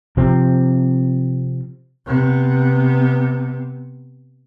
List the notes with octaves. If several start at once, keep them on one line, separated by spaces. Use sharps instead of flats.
C3 F3 C4
C3 B3